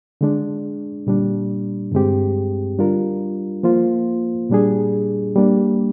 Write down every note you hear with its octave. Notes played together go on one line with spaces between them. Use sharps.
D3 G#3 D4
A#2 G3 D4
G2 D3 G#3 C4 G4
G3 D4 F4 A#4
F3 A#3 F4 C5
A#2 G3 D4 G#4
G3 A#3 D4